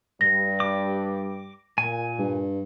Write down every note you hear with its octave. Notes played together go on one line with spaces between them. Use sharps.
G2 G3 A#6
D6
A#2 G#5
G2